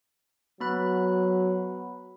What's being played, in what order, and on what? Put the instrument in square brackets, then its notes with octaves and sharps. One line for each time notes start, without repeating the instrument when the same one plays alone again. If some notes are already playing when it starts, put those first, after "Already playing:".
[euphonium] F#3 [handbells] B3 B5 F#6